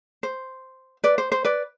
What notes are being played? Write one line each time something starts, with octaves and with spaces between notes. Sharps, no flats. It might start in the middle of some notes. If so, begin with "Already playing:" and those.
C5
B4 D5
C5
C5
B4 D5